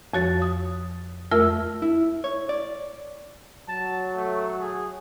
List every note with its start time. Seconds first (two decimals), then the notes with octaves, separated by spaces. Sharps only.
0.14 F2 F3 F#4 C#5 A6
0.42 D#6
1.31 F2 A3 F4 A#4 E5 E6
1.82 E4
2.24 C#5
2.49 D5
3.68 F#3 A5
4.16 A3
4.60 G#4